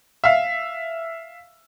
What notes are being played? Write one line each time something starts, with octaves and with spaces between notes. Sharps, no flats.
E5 F5